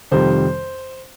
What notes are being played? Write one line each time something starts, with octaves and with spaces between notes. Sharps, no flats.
F2 C3 D#3 G3 C5